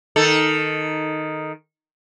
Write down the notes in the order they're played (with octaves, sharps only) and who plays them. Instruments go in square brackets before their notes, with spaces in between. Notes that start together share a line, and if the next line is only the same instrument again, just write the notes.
[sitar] D#3 A4